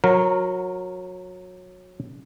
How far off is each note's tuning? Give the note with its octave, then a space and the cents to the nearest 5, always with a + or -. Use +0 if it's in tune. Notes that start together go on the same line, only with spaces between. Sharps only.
F#3 -20 A#4 +0